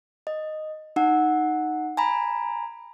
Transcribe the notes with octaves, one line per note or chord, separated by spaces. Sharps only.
D#5
D#4 F#5
G#5 A#5 B5